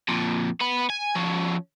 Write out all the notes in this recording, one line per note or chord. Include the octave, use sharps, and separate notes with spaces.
F2 A#2
B3 B5
G#5
F3 C#4